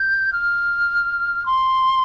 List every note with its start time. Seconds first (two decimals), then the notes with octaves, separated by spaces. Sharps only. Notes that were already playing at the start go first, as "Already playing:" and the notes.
Already playing: G6
0.33 F6
1.46 C6